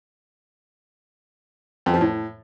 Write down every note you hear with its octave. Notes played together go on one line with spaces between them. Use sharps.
F2
F3
A2